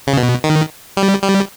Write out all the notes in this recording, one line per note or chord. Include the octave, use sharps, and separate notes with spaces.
C#3
B2
D#3
G3
G3